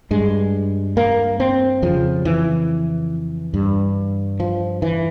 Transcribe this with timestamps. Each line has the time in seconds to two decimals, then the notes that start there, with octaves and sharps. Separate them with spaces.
0.11 G2 G#3
0.97 A#3
1.40 C4
1.82 F2 C#3 F3
2.25 E3
3.54 G2
4.40 F3
4.82 E3